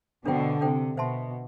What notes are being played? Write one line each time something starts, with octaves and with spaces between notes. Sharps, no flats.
B2 D3 D4 A4 C5 G5
C3 D4 A4 C5 G5
B2 C5 E5 A5 C6